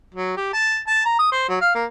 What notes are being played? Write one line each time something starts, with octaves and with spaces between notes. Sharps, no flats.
F#3
G4
A5
A5
A#5
D#6
C5
F#3
F5
A#3